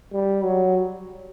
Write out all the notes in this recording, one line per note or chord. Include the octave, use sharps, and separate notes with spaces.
G3
F#3